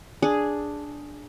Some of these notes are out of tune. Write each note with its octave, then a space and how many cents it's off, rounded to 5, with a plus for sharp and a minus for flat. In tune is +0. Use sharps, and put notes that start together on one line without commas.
D4 +0 G#4 +0